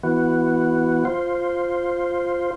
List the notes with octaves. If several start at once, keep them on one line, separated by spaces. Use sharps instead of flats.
E3 B3 F#4
F4 C5